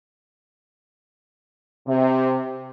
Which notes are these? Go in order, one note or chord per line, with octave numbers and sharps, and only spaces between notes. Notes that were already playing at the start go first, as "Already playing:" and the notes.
C3